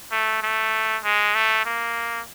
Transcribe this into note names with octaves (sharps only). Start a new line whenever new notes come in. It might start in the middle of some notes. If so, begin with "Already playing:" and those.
A3
A3
G#3
A3
A#3